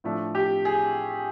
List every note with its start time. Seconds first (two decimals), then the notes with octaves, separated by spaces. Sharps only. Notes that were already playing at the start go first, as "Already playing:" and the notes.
0.04 A2 F3 A3 D4
0.35 G4
0.65 G#4